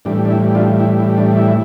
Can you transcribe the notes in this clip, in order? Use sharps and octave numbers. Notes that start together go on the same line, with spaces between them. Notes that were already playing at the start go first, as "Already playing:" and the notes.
A2 E3 G3 D4
D4
E4
D4 F4
E4
E4
D4
E4